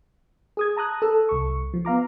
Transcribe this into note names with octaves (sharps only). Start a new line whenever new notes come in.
G#4 D#6 G#6
A5 A#5 D#6 F#6
A4 E6
C2 C#6
F3
B3 F5 A#5 D6